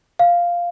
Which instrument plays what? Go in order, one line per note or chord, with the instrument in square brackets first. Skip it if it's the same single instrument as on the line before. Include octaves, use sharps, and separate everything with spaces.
[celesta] F5